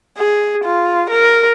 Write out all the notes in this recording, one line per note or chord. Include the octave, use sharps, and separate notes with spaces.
G#4
F4
A#4